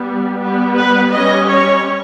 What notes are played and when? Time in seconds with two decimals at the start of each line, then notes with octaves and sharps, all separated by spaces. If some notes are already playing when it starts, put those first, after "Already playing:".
Already playing: G3 B3
0.41 G3 B3
0.77 B4
1.14 G3 C#4 D#5
1.49 C#5